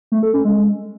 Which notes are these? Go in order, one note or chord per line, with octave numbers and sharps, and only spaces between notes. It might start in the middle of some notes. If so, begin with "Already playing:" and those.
A3
A4
C#4
G#3